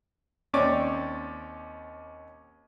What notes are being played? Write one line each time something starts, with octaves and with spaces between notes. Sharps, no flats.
D#2 C4 C#4 C#5 D5 D6